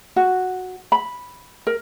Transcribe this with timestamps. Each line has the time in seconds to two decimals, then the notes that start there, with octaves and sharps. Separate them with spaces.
0.16 F#4
0.92 B5
1.67 A#4